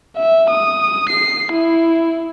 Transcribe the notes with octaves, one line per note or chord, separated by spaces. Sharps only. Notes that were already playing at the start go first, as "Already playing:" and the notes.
E5
D#6
C7
E4